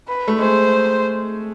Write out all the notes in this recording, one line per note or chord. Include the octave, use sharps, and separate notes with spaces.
B4
A3
G#3 C5